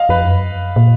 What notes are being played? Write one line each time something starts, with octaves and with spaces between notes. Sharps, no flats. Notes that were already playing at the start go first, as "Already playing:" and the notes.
Already playing: D#5 F5
F2 B4
F#2
A#2